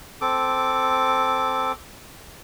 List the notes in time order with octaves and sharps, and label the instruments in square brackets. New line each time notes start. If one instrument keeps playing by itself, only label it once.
[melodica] C4 A4 D6